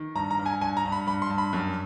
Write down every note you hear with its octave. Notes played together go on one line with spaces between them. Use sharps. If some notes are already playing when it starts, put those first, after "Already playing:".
Already playing: D#3
G2 A#5
A#5
G2
G#5
G2 G#5
A#5
G2
B5
G2 B5
C6
G2
B5
F#2